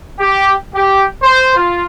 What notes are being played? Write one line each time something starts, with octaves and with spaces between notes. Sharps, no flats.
G4
G4
C5
F4